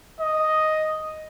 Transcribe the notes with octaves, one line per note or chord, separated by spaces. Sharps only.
D#5